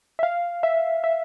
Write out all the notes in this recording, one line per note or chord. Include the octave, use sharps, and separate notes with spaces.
E5
F5
E5
E5